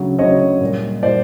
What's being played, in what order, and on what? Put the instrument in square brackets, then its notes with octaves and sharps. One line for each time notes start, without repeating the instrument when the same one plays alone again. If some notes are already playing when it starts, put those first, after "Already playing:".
Already playing: [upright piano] D2 C#3 F#3
D2 C#3 F#3 C#5 D#5
A#2 G3
A#2 G3 C5 D5